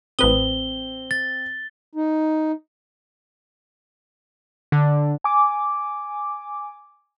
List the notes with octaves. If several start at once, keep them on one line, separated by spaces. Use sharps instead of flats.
A1 C4 B4 D#6 G7
A6
D#4
D3
G#5 D6